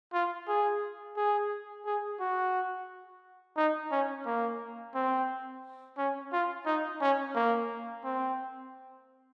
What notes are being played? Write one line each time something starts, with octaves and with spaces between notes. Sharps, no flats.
F4
G#4
G#4
G#4
F#4
D#4
C#4
A#3
C4
C#4
F4
D#4
C#4
A#3
C4